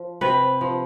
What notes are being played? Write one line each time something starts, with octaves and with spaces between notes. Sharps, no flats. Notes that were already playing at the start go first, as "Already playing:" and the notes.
Already playing: F3
C3 B4
F3